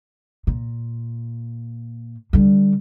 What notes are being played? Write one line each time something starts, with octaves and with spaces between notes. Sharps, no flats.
A#2
D3 G3